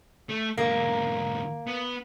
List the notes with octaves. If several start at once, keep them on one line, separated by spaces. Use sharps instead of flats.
A3
E2 G#2 A#3
B3